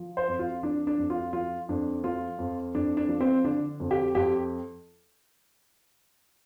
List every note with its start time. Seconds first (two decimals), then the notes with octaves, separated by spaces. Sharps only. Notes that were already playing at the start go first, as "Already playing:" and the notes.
Already playing: F3
0.17 C5
0.28 F2
0.39 F4
0.63 F3 D4
0.87 D4
0.98 F2
1.10 F4
1.33 F3 F4
1.69 F2 D4
2.04 F3 F4
2.39 F2
2.75 F2 D4
2.97 D4
3.09 F3
3.21 C4
3.44 D3 D4
3.80 F2
3.91 G4
4.15 F2 G4